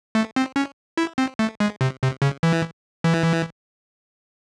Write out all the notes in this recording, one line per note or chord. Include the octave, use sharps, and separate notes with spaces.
A3
C4
C#4
E4
C4
A3
G#3
C3
C3
C#3
E3
E3